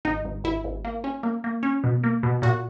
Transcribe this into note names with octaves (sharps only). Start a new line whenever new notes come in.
G#1 D#4
G#1
G#1 E4
G#1
A#3
C#4
A#3
A#3
C#4
B2
A#3
B2
A#2 F#4